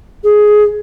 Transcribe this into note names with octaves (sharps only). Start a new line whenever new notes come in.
G#4